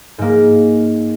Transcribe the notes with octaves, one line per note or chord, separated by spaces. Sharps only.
G#2 A#3